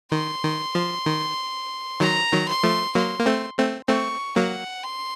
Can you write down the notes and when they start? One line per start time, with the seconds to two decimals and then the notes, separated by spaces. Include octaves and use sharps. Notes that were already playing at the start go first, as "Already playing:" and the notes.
0.12 D#3 C6
0.43 D#3
0.75 F3
1.06 D#3
2.00 D#3 F#3 A#5
2.32 D#3 F#3
2.48 C6
2.63 F3 A3
2.95 F#3 A#3 C6
3.19 A#3
3.26 A3 C4
3.58 A3 C4
3.89 A3 C4 C#6
4.36 F#3 A#3 F#5
4.83 C6